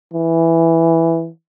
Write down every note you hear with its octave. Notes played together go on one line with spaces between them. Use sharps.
E3